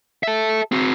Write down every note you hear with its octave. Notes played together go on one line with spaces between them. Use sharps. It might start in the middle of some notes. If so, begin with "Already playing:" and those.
A4 E5
C4 F#4